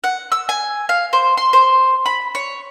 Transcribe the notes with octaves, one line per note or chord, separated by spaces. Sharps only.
F#5
E6
G#5
F5
C5
C6
C5
B5
C#5